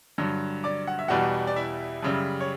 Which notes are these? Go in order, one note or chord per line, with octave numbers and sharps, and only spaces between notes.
G2 D3 F#3
D5 D6
F#5
E5
E2 B2 G3 F#4 F#5
D5
E4 E5
F#2 C#3 G3
C#5